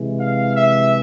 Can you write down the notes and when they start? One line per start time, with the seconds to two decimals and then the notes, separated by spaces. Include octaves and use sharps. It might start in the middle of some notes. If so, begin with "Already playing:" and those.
Already playing: C3 E3 G#3
0.18 F5
0.56 E5